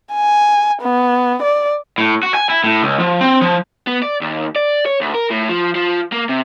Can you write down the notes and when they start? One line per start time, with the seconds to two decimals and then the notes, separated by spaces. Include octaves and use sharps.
0.14 G#5
0.82 B3
1.43 D5
1.98 A2
2.23 F#4
2.35 G#5
2.50 E4
2.64 A2
2.83 C#2
3.00 F3
3.21 C4
3.41 F3
3.87 B3
4.03 D5
4.21 D#2
4.56 D5
4.86 C#5
5.01 D2
5.15 A#4
5.31 A2
5.50 F3
5.75 F3
6.12 A#3
6.29 C3